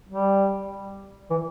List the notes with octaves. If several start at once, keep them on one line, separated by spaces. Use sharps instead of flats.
G3
E3